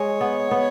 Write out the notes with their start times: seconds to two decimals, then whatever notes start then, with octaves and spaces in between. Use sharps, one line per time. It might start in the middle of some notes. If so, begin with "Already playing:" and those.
Already playing: G#3 C#5
0.21 B3
0.51 B3